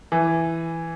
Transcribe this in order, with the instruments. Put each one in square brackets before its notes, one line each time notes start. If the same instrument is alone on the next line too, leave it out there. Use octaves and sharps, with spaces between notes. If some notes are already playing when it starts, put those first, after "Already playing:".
[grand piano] E3